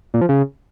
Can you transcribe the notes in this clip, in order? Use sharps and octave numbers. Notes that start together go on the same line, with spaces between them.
A#2
F3
C#3